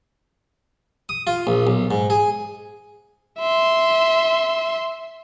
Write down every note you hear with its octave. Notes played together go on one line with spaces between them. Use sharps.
D#6
F4
A#1
B1
G#2
G#4
E5 C6